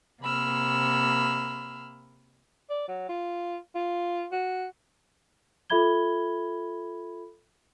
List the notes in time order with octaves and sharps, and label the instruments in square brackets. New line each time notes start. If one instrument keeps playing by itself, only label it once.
[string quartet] C3 A#3 B5 E6 F6
[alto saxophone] D5
F#3
F4
F4
F#4
[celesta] F4 A4 E5 B5 G#6 G7